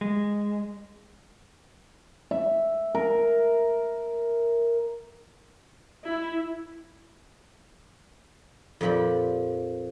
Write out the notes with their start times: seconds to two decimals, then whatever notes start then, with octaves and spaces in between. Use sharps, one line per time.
0.01 G#3
2.31 E5
2.95 A#4
6.04 E4
8.81 F2 A#2 F3 G4 B5